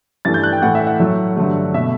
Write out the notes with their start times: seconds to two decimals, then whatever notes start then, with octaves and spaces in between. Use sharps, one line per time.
0.25 G2 E3 A3 A6
0.34 G6
0.43 F#6
0.53 G5
0.62 A2 E3 A3 F#5
0.75 E5
0.87 F#5
0.99 A2 F#3 A3
1.37 G2 D3 F#3 A3
1.74 B2 A3 E5